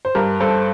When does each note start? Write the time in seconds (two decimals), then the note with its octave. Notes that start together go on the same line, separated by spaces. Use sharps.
0.05 C5
0.15 G2 G4 A#4
0.40 G2 A4 C5